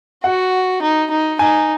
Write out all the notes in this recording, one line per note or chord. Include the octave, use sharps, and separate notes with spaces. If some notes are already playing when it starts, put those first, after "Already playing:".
F#4 F#5
D#4
D#4
D#4 G#5